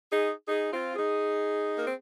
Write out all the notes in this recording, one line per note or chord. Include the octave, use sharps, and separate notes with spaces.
D#4 G#4
D#4 G#4
C4 F4
D#4 G#4
A#3
C4